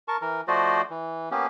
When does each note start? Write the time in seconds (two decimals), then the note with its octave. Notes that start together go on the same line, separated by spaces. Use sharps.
0.08 A#4 A5 C#6
0.21 E3 A#4
0.48 F3 A3 F#4 C5 D5 D#5
0.90 E3
1.31 A#3 B3 C#4 G4